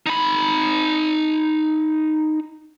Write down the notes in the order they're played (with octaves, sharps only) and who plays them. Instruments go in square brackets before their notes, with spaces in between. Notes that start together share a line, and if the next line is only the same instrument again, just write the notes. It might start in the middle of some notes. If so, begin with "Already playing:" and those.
[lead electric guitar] D#4 B5